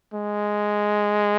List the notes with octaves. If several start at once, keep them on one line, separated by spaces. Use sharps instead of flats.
G#3